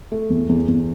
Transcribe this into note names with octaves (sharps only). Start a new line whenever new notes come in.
A3
E2
E2
E2